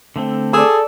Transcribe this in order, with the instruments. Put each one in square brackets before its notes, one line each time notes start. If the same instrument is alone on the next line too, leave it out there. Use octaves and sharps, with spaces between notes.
[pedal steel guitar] D3 A3 C4
[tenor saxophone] G#4 [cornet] A4 [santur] D5 E6